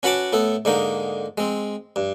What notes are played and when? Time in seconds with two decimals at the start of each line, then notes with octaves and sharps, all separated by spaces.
0.03 C#4 F#4 B4 F#5 A5 D6
0.33 A2 B3 A4
0.65 G#2 D3 A#3 D#4
1.38 G#3 C4
1.96 G2